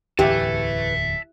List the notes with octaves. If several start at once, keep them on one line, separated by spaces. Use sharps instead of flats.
D1 E2 A2 E3 G4 E5 A5